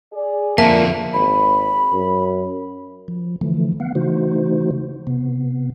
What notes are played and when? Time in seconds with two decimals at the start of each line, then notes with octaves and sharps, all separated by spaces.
0.13 G#4 D5
0.58 F2 D3 F3 A#3 D4 E5 A5
1.13 G#1 B5
1.92 F#2
3.08 F3
3.41 D3 E3 F3 A3
3.80 B3 F5 F#5
3.95 C#3 E3 A3 D#4 F#4 C5
5.07 C3 B3